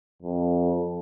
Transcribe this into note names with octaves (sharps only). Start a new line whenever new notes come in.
F2